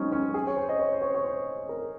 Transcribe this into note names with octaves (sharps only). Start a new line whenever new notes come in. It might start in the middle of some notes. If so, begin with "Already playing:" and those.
Already playing: F#3 G#3 C4 C#4 D#4
C#4
G#4
C#5
C5
D#5
C#5
C5
C#5
C#5
C5
A#4